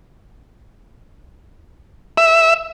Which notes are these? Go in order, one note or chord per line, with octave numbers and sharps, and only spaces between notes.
E5